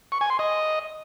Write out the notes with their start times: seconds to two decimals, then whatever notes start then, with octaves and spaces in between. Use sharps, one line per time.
0.12 C#6
0.21 G#5
0.30 C6
0.39 D#5